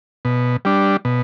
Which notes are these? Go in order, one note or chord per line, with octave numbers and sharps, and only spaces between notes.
B2
G3 D4
B2